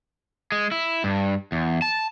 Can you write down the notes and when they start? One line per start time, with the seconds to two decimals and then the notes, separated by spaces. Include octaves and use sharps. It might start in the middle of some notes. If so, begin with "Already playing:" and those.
0.52 G#3
0.71 E4
1.04 G2
1.52 E2
1.82 A5